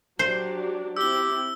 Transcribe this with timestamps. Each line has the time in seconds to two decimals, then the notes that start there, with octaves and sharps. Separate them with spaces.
0.19 F#3 D4 G4 C5
0.97 C4 E4 G4 E6 G7